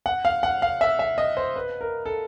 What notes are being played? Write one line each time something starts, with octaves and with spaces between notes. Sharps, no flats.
F#5
F5
F#5
F5
E5
E5
D#5
C5
B4
A#4
A4